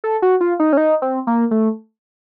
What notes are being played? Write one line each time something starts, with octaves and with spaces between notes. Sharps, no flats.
A4
F#4
F4
D#4
C#4
D#4
C4
A#3
A3